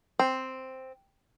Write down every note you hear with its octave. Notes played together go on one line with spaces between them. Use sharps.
C4